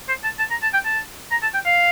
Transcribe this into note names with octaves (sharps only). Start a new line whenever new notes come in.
C5
A5
A5
A#5
A5
G5
A5
A#5
A5
G5
F5